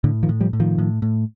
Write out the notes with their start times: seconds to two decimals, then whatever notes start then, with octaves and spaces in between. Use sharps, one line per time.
0.04 A2 D3
0.23 D#3 F3
0.29 A2
0.41 F3 G3
0.53 A2
0.60 D#3 F3
0.78 A2
1.02 A2